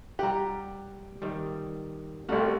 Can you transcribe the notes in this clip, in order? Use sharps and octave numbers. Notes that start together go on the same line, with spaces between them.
G3 G4 F#5 A#5
D#3 G3
C2 G3 A3 F#4 F5 F#5